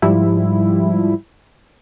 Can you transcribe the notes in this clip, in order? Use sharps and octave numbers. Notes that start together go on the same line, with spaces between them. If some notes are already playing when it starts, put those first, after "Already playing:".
G#2 F3 G3 E4